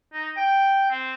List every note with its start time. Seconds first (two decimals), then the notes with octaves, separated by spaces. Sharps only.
0.13 D#4
0.37 G5
0.91 C4